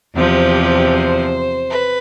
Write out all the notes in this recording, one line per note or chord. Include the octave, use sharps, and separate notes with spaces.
E2 C3 F3 G4
C5
B4